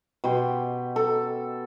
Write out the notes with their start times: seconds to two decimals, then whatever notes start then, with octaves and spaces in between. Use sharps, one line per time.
0.24 B2 G4 C6
0.96 A4